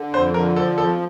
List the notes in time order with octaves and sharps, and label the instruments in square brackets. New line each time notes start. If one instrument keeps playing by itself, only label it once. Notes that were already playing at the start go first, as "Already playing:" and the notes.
Already playing: [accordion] D3
[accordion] F2 [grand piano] C5
[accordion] D3 [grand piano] A#4
[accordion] F3 [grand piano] A4
[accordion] F2 [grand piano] A4